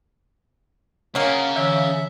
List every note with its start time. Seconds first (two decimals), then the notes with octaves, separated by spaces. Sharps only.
1.15 C#3 F#3 A#3 C#5 F#5
1.56 D3 E3 C#5 E5